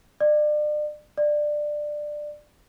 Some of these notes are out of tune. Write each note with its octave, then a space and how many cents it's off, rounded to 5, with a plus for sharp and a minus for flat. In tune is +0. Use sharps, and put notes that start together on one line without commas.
D5 +35
D5 +15